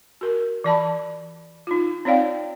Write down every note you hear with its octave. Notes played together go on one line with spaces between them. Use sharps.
F#4 A#4
E3 D5 A5 B5
D#4 F4
C4 D#4 C#5 D5 F5 G5